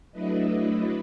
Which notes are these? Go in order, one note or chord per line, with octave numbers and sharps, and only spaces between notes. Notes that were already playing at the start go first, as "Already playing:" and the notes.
F#3 A3 D4 E4 B4 D#5